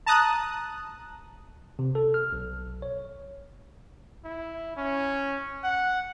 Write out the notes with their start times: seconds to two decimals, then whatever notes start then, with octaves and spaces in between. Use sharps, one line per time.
0.06 A5 A#5 D#6 F#6
1.79 C3
1.95 A4
2.14 F6
2.33 B1
2.82 C#5
4.25 E4
4.77 C#4
5.64 F#5